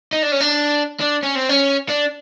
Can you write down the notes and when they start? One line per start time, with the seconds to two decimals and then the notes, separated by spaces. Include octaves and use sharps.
0.13 D#4
0.23 D4
0.32 C#4
0.41 D4
1.01 D4
1.23 C#4
1.36 C4
1.49 C#4
1.89 D4